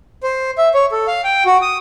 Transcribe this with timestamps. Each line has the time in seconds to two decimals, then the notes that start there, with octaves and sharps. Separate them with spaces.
0.23 C5
0.58 E5
0.74 C#5
0.92 A4
1.08 F5
1.24 G5
1.46 F#4
1.62 D#6